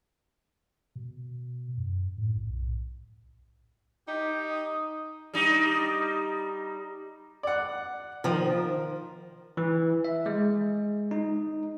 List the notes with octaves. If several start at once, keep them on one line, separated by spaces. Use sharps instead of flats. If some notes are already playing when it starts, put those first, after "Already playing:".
B2
F#2
A2
B1
D#4 G4
D#6
G3 D#4
D5 F#5
D#3 F3 A#4
E3
E5
G#3
D#4